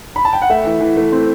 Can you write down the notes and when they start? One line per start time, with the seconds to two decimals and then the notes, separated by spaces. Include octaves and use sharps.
0.16 B5
0.25 A5
0.33 G5
0.42 F#5
0.50 A3 E5
0.65 E3
0.80 E3
0.97 A3
1.12 C4